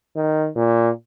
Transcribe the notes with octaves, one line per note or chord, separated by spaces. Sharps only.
D#3
A#2